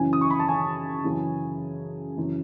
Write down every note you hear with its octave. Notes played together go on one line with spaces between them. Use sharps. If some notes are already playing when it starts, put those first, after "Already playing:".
Already playing: F#2 C#3 E3 G#5
D#6
C#6
B5
A5
G#5
F#2 C#3 E3
F#2 C#3 E3